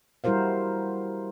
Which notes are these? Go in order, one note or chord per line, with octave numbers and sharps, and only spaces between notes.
G3 E4 F#4 A#4 C5 F5